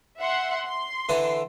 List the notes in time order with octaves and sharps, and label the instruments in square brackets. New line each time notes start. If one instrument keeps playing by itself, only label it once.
[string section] E5 F#5 C6
C6
[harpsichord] D3 E3 A4